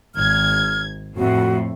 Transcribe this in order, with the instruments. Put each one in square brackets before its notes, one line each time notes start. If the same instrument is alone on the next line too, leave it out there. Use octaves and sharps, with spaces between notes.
[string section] G#1 G#6 [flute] F6
[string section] F2 A2 [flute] F#4